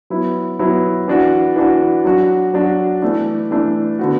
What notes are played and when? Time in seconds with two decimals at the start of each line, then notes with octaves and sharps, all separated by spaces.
0.10 F#3 B3 E4
0.59 F#3 B3 E4
1.08 E3 D4 F#4
1.56 E3 D4 F#4
2.04 F#3 D4 F#4
2.54 F#3 D4 F#4
3.02 E3 A3 D4
3.51 E3 A3 D4
3.99 D3 B3 F#4